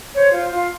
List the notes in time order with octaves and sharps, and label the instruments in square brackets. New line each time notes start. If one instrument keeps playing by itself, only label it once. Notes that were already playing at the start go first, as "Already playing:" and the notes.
[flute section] C5 C#5
F4
F4